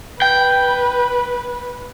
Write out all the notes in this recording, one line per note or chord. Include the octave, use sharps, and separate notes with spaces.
B4 G5